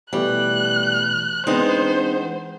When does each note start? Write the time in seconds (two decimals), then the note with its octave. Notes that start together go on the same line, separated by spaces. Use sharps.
0.13 B2 E3 G3 A3 F#6
1.47 E3 G#3 B3 C4 D4 D#4 C5